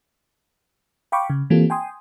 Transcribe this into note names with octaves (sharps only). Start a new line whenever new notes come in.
F5 G5 B5 C#6 D6
C#3
E3 A#3 C4 F4 G4 A4
G5 G#5 C6 D#6